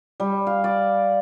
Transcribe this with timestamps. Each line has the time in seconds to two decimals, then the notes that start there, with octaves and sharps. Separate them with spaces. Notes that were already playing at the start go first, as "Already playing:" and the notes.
0.20 G3
0.47 F5
0.64 D5